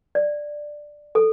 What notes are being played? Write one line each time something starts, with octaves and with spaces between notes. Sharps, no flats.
D5
A4